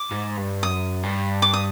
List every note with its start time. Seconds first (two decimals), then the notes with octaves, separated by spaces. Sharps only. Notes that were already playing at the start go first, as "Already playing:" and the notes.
Already playing: D6
0.11 G#2
0.37 G2
0.63 F#2 D#6
1.03 G2
1.42 D6
1.53 D#6